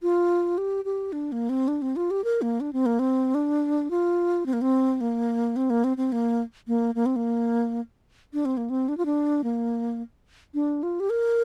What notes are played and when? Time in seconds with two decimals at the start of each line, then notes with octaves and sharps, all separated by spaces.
0.02 F4
0.58 G4
0.85 G4
1.12 D4
1.32 A#3
1.49 C4
1.68 D4
1.82 C4
1.96 F4
2.11 G4
2.24 A#4
2.42 A#3
2.60 D4
2.73 C4
2.86 A#3
2.99 C4
3.35 D4
3.91 F4
4.46 C4
4.53 A#3
4.61 C4
5.01 A#3
5.56 C4
5.70 A#3
5.84 C4
5.97 C4
6.12 A#3
6.68 A#3
6.95 A#3
7.06 C4
7.16 A#3
8.33 D4
8.45 C4
8.57 A#3
8.70 C4
8.89 D4
8.97 F4
9.05 D4
9.44 A#3
10.54 D4
10.83 F4
11.00 G4
11.10 A#4